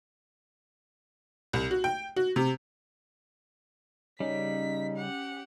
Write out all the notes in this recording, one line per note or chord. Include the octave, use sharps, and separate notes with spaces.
C2
F#4
G5
F#4
C3
C#3 G3 C#4 D#4 B6
G4 F#5